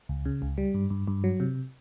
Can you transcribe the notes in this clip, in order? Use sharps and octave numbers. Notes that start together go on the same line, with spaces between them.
C#2
C#3
C#2
G3
G2
G2
G2
F#3
C3